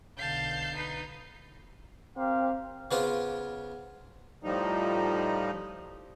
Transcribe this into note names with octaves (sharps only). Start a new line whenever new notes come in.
B1 D3 F5 A5 G6 C7
D#4 B4
C4 G4 A#4 F5
C#3 B3 F4 C5 D6
A2 F3 G3 D#4